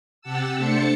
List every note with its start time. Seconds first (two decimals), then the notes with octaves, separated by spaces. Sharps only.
0.21 C3 G4 F#5 A5 E6
0.56 A3 D4 C5 A5 C#7